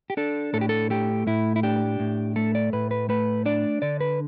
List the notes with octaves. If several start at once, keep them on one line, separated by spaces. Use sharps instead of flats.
G4
D4 A4
A2 A4
G4
A4
A3 G4
A2 E4
E4
D4 G4
A2
A3 A4
D5
A2 B4
B4
A3 B4
D4 D5
D3 D5
B4